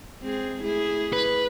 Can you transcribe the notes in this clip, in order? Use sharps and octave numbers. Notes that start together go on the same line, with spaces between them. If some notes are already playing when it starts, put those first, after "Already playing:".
G#3 C4 G#4
A3 E4 G#4
B4